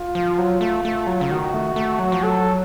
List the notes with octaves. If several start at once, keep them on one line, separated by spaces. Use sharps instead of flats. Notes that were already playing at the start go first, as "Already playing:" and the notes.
Already playing: F4
F3
F#3
A3
A3
F#3
C#3
D#3 F#4
A3
A3
F#3
F3
F#3 A4